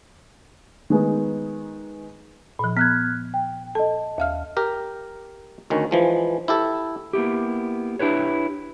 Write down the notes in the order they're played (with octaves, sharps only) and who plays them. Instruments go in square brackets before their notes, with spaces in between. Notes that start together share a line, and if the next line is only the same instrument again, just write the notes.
[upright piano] D#3 G#3 B3 D#4
[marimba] A#2 F3
[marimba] B3 [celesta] F6 F#6 G#6
[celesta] G5
[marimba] A4 [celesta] D#5 A5
[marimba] D#2 F5 F6
[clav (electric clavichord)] G4 A#4
D2 D#3 C#4
E3 F3 G#3
E4 G4 A4
[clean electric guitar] A#3 B3 E4 G4
D4 E4 G4 B4 C#5